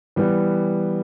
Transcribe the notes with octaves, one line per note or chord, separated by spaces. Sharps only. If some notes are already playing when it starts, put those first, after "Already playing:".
E3 G3 B3